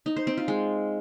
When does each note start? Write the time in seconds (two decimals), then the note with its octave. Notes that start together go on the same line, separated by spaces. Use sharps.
0.06 D#4
0.16 C5
0.27 C4
0.37 F4
0.48 G#3